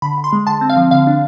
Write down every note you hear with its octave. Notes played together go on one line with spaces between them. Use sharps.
D3 B5
D3
C6
G#3
D3 A5
C4
F5
F3
D3 F5
D4